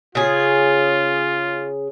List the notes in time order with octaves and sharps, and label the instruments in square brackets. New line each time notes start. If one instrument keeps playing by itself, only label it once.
[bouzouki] C#3 G#4 [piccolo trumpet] F4